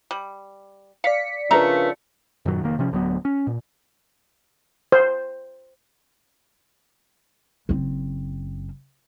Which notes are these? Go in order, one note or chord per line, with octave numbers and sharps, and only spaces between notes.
G3
D5 F5 B6 C#7
C#3 F3 A3 D4 F4 A#4 B4 A#5
F#2 A#2 D#3 F#3
F1 D#3 A#3
C3 F3 C#4
D1 D2 F#3 B3
C#4
A#2
C5
F#1 C4